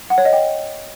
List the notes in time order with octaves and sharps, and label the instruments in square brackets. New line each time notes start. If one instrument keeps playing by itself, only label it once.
[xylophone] F#5
C#5
D#5
G5